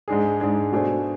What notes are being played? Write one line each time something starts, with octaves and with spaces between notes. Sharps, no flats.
G#2 G#3 D4 G#4
G#2 G#3 D4 G#4
B2 A3 D4 G#4 C5